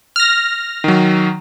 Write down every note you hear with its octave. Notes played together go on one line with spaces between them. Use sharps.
F6 A#6
D#3 F#3